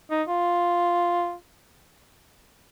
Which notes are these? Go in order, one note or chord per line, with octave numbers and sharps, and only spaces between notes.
D#4
F4